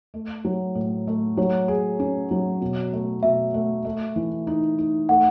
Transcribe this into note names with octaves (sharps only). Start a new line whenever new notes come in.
A3
F#3
A2
A3
F#3 C#5
G#4
C#4
F#3
B2
A3
B2 E5
A3
A3
E3
D#4
D#4
A3 F#5